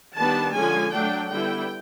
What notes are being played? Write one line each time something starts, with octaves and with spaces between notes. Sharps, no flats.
D#3 G3 B3 D4 A5
D3 F3 G#3 C#4 G#5
F#3 A3 D4 G5
D3 G3 B3 E4 G5